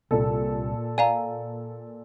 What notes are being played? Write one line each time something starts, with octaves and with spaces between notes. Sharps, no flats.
C2 A#2 A4
D5 F5 G#5 A#5